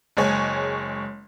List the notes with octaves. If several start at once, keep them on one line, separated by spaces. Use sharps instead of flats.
F#1 G#3 C#5 G#5